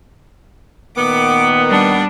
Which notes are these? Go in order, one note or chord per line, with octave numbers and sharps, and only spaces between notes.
A#2 D#3 B3 D6
G3 D4